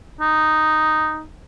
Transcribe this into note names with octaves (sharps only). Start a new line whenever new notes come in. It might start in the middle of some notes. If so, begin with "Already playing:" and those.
D#4